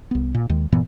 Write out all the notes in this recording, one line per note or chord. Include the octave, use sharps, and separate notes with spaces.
C2 B3
A#2
D#2 D#3 G#3
G2 A#2 E3 B3